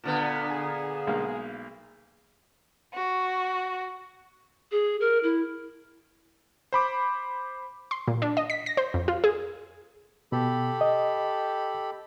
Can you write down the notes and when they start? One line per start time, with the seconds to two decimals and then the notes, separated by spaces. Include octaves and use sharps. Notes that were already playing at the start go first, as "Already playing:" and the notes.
0.04 A#2 D3 B3
0.51 G#4
1.07 B1 G#3 A#3
2.94 F#4
4.71 G#4
5.00 A#4
5.23 E4
6.73 C5 B5 D6
7.91 C6
8.08 A#2
8.22 D4
8.37 D#5
8.50 B6
8.66 A#6
8.77 C5
8.94 F2
9.08 F4
9.24 G#4
10.32 B2 G4 A4 B5
10.81 D#5